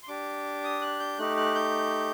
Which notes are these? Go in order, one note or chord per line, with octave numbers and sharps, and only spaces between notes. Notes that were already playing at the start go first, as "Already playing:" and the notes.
C6
D4 G4 D6
D#6
F#6
G6
A3 D#4 G4 F#6
F#6
G6